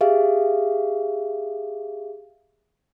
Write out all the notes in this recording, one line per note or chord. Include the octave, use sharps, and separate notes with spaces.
G4 G#4 E5 F5